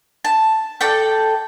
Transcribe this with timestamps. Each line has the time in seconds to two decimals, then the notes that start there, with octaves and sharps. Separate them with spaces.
0.25 A5
0.81 A4 D5 G5